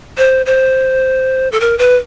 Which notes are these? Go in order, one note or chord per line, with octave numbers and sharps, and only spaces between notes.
C5
C5
A4
A#4
B4